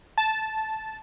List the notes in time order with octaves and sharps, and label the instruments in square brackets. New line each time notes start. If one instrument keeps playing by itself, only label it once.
[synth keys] A5